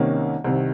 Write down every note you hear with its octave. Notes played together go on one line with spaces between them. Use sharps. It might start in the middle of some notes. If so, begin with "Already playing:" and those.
Already playing: C2 C3 D#3 A#3 C#4
C2 C3 D#3